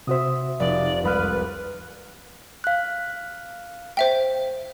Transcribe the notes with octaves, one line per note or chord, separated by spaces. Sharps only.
C3 F#4 C5 E5 D#6
F1 D5
C2 F#2 G#3 B4 B5 F6
F5 F#6
C5 E5 G5